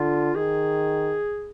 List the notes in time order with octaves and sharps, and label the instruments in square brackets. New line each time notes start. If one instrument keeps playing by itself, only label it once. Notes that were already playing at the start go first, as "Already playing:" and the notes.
Already playing: [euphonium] D3 [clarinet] F4
[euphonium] D#3 [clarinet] G#4